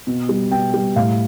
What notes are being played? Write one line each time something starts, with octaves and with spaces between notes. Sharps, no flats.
B2
G3
B2 G5
G3
A2 F5